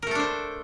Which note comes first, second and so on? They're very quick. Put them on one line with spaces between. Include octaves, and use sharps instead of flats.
A#4 A3 A4 D4 C5